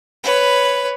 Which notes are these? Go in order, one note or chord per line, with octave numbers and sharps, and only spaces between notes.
B4 C#5